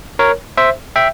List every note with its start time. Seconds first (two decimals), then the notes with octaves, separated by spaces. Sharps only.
0.19 A#4 C#5
0.57 C5 E5
0.96 E5 G5